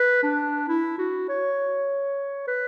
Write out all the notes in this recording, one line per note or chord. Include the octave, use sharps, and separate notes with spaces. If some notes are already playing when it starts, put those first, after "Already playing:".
Already playing: B4
D4
E4
F#4
C#5
B4